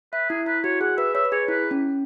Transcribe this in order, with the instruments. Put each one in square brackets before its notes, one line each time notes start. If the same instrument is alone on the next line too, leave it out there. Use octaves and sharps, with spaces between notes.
[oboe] B4 [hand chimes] E5
[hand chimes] E4 [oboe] G#4
[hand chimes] E4 [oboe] B4
[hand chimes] F#4 [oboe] C#5
[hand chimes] G#4 [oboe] F#5
[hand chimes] B4 [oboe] E5
[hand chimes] C#5 [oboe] E5
[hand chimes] B4
[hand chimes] G#4 [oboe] C#5
[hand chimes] E4 [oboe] B4
[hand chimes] C#4